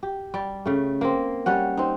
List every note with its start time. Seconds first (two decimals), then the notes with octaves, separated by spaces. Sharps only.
0.03 G4
0.34 G3 D5
0.66 C#3 A3
1.01 A#3 C4
1.46 G3 C#4 F#5
1.77 C4 D#4